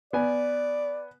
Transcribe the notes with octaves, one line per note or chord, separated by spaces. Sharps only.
B3 D5 G#5